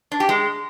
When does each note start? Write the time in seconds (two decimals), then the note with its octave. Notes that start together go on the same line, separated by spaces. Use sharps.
0.12 D4
0.20 G4
0.29 G#3